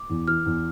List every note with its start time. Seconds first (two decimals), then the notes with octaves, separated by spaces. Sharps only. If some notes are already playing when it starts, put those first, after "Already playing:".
Already playing: D6
0.10 E2
0.28 E3 F6
0.46 E2